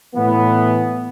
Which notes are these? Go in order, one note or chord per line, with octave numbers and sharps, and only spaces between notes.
A2 E3 B3